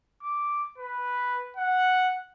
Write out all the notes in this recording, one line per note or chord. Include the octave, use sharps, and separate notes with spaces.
D6
B4
F#5